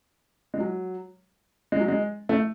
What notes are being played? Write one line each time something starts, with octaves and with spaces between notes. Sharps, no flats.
G#3
F#3
G#3
F#3
G#3
A3